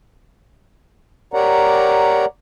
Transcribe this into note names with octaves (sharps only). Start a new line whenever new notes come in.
G4 A#4 C#5 D5 F#5 A#5